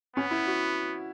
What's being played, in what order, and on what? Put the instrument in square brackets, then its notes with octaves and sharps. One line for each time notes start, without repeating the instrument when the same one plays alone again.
[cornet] B3 [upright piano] C#4
[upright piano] E4
F#4